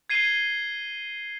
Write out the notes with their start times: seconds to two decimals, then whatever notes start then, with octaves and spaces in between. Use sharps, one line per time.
0.10 G#6 C7 D#7 G7